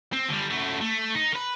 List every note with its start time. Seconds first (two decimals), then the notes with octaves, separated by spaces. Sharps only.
0.13 C4
0.29 D3 G3
0.50 F#2 A3
0.81 A3
1.15 D#4
1.32 A#4 B4